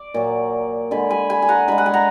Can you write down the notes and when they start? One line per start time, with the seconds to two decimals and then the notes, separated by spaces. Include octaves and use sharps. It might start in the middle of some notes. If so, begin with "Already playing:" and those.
Already playing: D5
0.14 A#2 F#3
0.91 D3 G#3 G#5 B5
1.10 G#5 B5
1.30 G#5 B5
1.42 G#5
1.49 F#5 A#5
1.68 D3 G#3 G#5 B5
1.78 F#5
1.86 G#5
1.94 F#5 A#5